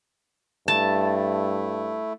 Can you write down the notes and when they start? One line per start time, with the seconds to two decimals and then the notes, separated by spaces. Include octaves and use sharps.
0.68 G2 A3 E4 A5